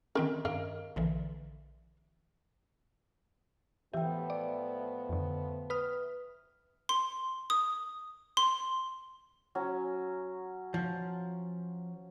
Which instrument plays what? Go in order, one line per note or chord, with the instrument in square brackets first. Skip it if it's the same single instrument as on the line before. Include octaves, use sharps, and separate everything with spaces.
[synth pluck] D#3 C4 C#4 [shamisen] A#4
[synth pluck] G2 [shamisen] A#4 D#5 F5
[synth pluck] A#1 D3 E3
[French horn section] A2 F3 B3 [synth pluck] E3 G4 [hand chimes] E5 G5
[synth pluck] D5
F2 D3
B4 D#6 F6
[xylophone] C6
D#6
C6
[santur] F#3 C#4
[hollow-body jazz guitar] F3